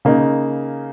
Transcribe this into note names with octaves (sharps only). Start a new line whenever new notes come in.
C#3 A#3 D#4